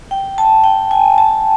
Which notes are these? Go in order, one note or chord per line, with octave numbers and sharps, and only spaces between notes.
G5
A5
G5
G#5
A5